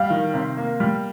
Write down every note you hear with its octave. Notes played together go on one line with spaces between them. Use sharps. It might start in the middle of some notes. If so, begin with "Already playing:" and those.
Already playing: G3 F5
D#3
C3
A#3
G3